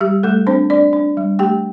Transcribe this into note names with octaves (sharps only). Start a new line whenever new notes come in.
G3 G4
G3 A3 A4
C4 D4 C5
D4 D5
D4
G3
A3 G4 G5